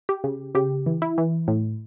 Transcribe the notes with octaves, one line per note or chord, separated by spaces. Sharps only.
G4
C#3
C#3 G4
E3
E4
E3
A2